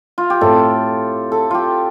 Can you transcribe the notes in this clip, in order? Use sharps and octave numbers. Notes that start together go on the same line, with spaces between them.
F4
G4
A2 A3 C4 A4
A4
F4 G4